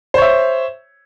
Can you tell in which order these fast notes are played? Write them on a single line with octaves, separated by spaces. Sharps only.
C5 C#5 E5